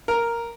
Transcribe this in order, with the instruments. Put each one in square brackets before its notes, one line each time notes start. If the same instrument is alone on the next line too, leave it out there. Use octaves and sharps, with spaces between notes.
[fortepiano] A#4